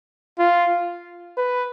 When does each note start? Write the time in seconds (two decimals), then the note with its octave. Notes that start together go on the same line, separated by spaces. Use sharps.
0.39 F4
1.37 B4